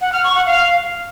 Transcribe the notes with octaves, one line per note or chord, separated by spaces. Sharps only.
F#5
F6
C#6
F#5
F5